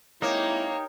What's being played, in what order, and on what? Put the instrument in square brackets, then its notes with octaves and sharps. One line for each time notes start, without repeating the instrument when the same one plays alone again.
[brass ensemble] G#3 C4 E4 [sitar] A#3 [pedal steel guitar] D#4 G4 [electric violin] C#5